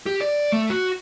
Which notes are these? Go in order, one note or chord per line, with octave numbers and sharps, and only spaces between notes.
G4
D5
A3
F#4